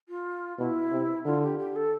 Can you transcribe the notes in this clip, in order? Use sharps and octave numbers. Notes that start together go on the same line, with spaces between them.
F4
B2 E4
C3
D3 F4
G4
G4
A4